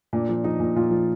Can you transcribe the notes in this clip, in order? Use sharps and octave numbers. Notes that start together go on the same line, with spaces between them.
A#2 D4
F3
F3 D#4
A#2
A#2 F4
F3